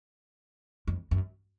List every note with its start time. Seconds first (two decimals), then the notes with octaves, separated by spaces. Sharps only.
0.87 F2
1.11 F#2